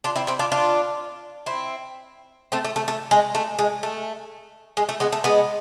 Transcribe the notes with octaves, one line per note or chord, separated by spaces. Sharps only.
D4 F4
C4 E4
C4 E4
D4 F4
D4 F4
C4 E4
A3 C4
A3
A3
A3
G#3
A3
G#3
A3
G#3
A3
G#3 B3
A3
G#3 B3